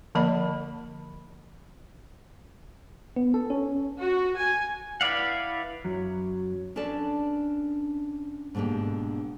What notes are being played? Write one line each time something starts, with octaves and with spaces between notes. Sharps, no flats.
D3 F3 A#3 A#4 D#5 B5
B3
A4
C#4
F#4
G#5
E4 B4 D5 F5 F#5
F#2 F#3
C#4 D4 A4 B4 D5 A5
G#2 B2 D3 A#3 G4